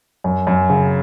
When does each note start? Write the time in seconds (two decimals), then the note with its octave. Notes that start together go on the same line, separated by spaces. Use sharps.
0.24 F#2
0.47 F#2
0.70 C#3